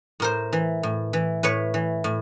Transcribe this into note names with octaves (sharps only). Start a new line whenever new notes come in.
A2 A#4 C5
E3
A2
E3
A2 B4 C#5
E3
A2